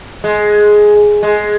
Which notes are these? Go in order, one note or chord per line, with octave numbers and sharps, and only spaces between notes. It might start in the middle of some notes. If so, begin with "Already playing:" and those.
G#3
G#3